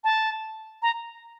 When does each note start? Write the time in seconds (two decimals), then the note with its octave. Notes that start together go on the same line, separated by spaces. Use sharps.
0.04 A5
0.82 A#5